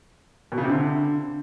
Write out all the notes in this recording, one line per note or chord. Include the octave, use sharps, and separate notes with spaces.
B2
C#3
C3
D3